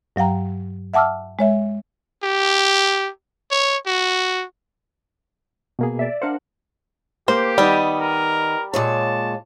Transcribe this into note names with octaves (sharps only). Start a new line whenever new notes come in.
G2 F#3 F5 G5 A#5
E5 F#5 A5 D6 E6 F6
G#3 C#5 E5
G4
C#5
F#4
B2 A#3 G#4
D5 E5
D4 A#4 C5 F5 F#5
A#3 G4 C5
D#3 G3 B3 D#5
A#4
A#2 G#3 C#5 A5